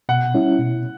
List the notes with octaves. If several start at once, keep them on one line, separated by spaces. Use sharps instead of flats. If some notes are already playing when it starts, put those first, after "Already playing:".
B2 F#5
G3 C#4 E4
B2